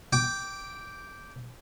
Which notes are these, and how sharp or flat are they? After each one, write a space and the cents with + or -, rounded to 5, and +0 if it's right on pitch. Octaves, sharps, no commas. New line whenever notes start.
G5 +0 D6 -10